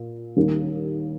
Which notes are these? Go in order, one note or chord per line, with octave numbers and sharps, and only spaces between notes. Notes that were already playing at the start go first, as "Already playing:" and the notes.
Already playing: A#2
D#2 D#3 G3 A#3